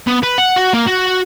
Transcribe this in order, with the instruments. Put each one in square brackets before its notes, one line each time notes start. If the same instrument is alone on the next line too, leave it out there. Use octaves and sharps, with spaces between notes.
[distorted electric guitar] B3
B4
F#5
F#4
A#3
F#4